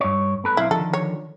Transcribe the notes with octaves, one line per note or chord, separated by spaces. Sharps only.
G2 C#5
B3 A4 B4
B1 C4 E4 F5
D3 D#3 F3 A4
C#5